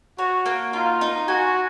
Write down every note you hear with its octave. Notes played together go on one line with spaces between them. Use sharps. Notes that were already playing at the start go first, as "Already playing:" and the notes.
F#4 C#5
A#3
D#4 F4
D#4
F#4 G#5